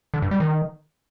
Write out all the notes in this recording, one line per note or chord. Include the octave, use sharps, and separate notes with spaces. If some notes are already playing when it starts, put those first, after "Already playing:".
D3
G2
G3
D#3